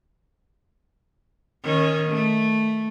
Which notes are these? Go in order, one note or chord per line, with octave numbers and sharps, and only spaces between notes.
D#3 C#4
A3